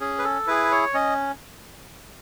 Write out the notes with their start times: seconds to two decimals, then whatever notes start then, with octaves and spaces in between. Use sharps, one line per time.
0.01 C#4 G#4
0.19 B4
0.24 A4
0.47 E4 G#4 B4
0.72 C#5
0.94 C#4 D#5